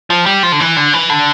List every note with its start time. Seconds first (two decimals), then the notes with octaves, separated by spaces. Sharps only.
0.10 F3
0.26 G3
0.43 F3
0.52 D3
0.60 E3
0.77 D3
0.93 E3
1.09 D3